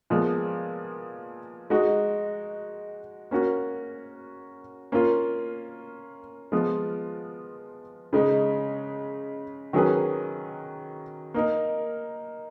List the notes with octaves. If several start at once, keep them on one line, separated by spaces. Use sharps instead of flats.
A#2 F3 G#3 B3
G#3 D#4 F#4
A#3 C#4 F#4
A#3 C#4 F4
F3 G#3 B3 F4
C#3 G#3 D#4
D#3 F#3 C#4 G#4 B4
A#3 D#4 A#4